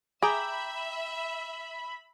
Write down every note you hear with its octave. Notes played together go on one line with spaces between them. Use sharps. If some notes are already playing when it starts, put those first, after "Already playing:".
G#4 E5 G5 A#5 B5 D6